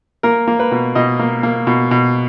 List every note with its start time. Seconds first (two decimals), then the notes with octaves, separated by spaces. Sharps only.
0.23 A#3 A#4
0.48 A#3
0.60 B4
0.71 B2
0.95 B2 D#5
1.19 A#3
1.43 A#3
1.67 B2
1.91 B2